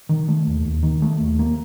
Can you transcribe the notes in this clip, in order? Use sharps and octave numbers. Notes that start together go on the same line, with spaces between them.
D#3
A3
D#2
D#2
D#3
A3
D#2
A#3